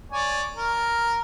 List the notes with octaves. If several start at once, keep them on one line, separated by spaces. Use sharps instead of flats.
C#5 D5 G#5
A#4